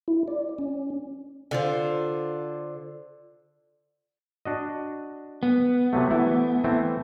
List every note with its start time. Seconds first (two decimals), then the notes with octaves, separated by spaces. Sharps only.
0.08 E4
0.28 D5
0.58 C#4
1.51 D3 F4 C5
4.45 D4 F#4 D#5
5.43 B3
5.93 C3 F#3 A3
6.10 E3 A3 E4
6.64 E3 A3 C4